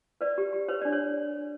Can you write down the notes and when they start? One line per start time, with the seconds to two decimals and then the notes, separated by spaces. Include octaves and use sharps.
0.21 B4 D5
0.38 G4
0.53 G4
0.68 B4 C#5
0.82 D4 D5
0.92 C#5